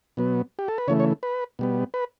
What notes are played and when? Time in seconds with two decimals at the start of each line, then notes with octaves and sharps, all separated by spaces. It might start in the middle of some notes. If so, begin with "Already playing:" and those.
0.17 B2 F#3 B3
0.59 G4
0.68 A4
0.78 B4
0.88 C#3 E3 A3 C#5
1.00 C#5
1.23 B4
1.59 B2 G3 B3
1.94 B4